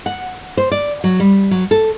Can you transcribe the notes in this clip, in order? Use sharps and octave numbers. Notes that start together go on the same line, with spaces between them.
F#5
C5
D5
F#3
G3
F#3
A4